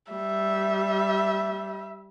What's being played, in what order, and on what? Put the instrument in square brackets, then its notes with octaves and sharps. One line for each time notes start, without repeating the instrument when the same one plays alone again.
[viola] G3 [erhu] E5